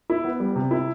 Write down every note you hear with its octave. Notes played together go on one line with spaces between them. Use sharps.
E4
B3
G3
C3
E4